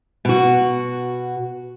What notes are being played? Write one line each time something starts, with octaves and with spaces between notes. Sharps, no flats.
B2 F#4